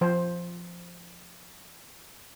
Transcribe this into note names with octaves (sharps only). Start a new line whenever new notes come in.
F3 C5